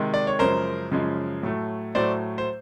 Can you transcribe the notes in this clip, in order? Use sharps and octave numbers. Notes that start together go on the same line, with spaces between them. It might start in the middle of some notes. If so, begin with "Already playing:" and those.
Already playing: C3 D#3 G#3
D5
C#5
F#2 C#3 F3 G#3 A#4 C5
F#2 C#3 F3 G#3
A2 F#3 A3
A2 F#3 A3 C5 D5
C5